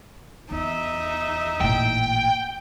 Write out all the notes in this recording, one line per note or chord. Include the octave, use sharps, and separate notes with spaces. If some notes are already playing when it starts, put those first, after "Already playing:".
E2 D#4 E5
A1 A#2 G5